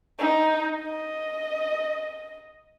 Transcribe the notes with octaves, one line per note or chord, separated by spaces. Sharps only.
D#4
D#5